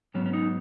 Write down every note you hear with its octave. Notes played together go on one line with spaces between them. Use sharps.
G#2 F#3 B3 C#4
C#4
D#4